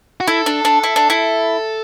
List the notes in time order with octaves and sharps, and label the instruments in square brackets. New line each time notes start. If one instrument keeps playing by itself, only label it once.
[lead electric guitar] F#4
[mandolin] E4 [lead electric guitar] A4
[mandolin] D4
D4
E4
D4
E4